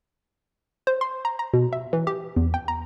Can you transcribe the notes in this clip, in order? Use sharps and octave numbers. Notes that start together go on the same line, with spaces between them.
C5
C6
A#5
A#5
B2
E5
E3
G4
E2
G5
A#5